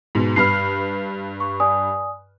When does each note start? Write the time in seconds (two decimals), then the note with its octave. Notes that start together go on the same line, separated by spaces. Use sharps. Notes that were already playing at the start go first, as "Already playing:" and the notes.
0.15 G#2 B2
0.36 G2 B4 B5 F6 C7
1.40 C#6
1.60 D5 G#5 D#6